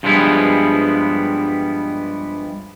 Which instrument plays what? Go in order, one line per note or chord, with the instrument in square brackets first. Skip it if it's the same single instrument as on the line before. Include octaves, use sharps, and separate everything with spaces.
[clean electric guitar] G2 F3 G3 G#3 B3 E4